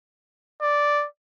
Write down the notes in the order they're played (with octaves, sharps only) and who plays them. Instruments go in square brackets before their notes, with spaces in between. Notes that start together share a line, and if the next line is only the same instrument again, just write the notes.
[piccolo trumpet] D5